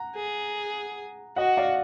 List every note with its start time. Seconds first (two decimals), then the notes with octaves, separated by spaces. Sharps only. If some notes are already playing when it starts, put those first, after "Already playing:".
Already playing: F#5 A#5
0.16 G#4
1.36 F#4 D#5 F#5
1.57 D5 F5